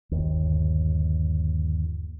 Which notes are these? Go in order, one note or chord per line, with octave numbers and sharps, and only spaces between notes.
G1 D#2